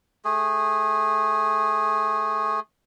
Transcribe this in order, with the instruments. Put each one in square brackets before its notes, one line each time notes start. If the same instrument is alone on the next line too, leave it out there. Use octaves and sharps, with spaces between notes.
[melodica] A3 G#4